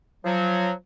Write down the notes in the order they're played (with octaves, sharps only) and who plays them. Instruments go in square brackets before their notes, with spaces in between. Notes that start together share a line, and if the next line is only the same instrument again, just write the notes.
[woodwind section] F3 F#3